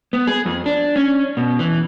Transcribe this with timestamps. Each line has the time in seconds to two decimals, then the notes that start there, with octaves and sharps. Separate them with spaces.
0.13 B3
0.27 G#4
0.46 F2
0.66 D4
0.96 C#4
1.37 B2
1.59 E3